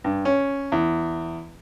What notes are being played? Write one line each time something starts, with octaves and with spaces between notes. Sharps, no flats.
G2
C#4
E2